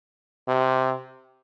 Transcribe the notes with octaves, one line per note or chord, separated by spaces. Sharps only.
C3